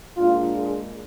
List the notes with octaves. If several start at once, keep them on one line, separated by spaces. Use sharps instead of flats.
A#2 G#3 D4 F4
G#4